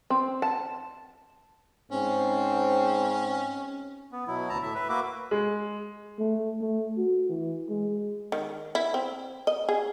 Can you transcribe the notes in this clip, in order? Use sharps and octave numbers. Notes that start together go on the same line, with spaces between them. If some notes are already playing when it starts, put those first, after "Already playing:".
C4
A5
G#2 C4 C#4
B3
B2 F#3 E4
D2 A5 A#5
A2 E5
B4 E5
A#3 F#4 B4 E5 D6
G#3
A3
A3
F#4
E3
G#3
D#3
E4
C4
D#5
G#4